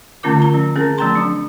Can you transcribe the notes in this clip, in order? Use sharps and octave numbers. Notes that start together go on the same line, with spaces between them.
D3 A3 C#4 F4 A#4 D6
F4 A#5
F3 C#4
C4 C#4 G#4 A#4
F3 A3 C4 G5 A#5 C6
F#3 D4